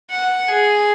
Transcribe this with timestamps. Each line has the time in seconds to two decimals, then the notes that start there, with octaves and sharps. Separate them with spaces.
0.11 F#5
0.48 G#4